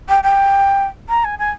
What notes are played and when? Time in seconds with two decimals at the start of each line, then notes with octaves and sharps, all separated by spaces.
0.08 G5
0.23 G5
1.09 A#5
1.24 G#5
1.38 G#5